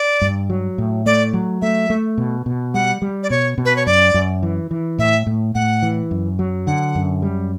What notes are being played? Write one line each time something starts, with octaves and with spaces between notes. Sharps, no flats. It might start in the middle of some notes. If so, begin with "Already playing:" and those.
Already playing: D5
G2
F#3
A2
A3 D5
F#3
A3 E5
A3
B2
B2
G3 F#5
G3
D5
B2 C#5
B2
B4
C#5
F#2 D5
F#2
E3
E3
A2 E5
A2
A2 F#5
E3
F#2
F#3
D3 F#5
F#2
G3